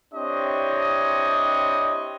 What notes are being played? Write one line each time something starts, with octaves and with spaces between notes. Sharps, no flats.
C4 D4 E4 G4 C#5 D#5